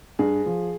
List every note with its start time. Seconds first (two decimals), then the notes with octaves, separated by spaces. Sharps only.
0.19 G2 G#4
0.46 F3